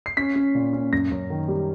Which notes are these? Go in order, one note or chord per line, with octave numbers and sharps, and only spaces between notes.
C7
C#4 B6
C#4
A#2
C#4
F#2 A#6
F#2
D#3
G3